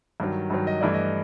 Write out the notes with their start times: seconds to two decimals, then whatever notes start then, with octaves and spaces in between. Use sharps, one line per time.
0.20 G2 D#3 F#3
0.50 G2 D#3 F#3
0.67 D#5
0.81 G2 E3 A3 D5
0.94 D#5